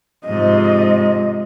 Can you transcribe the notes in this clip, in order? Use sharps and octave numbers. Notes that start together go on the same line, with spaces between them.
G#2 C3 F3 D#5